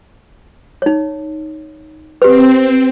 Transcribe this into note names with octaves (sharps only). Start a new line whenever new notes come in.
D#4 C#5
C4 G4 B4